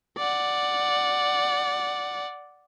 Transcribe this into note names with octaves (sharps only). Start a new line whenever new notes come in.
D5 F#5